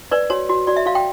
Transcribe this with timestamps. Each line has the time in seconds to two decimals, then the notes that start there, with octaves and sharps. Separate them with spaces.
0.11 B4 D5
0.30 F#4 C#5
0.49 F#4
0.67 F#4 D5
0.76 E5
0.86 F#4 F5
0.95 G5